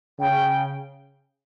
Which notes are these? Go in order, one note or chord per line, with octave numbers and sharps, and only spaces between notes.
C#3 G5